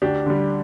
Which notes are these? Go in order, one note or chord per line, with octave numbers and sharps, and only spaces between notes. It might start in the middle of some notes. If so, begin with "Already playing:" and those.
D2 D4 G4
D3 G3